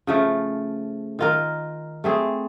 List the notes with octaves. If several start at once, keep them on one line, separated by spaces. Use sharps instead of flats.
C#3 F3 A3
D#3 F4 A#4
A3 C4 G#4